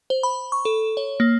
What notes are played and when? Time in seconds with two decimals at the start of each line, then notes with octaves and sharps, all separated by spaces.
0.10 C5
0.23 B5
0.52 C#6
0.65 A4
0.97 C#5
1.20 A#3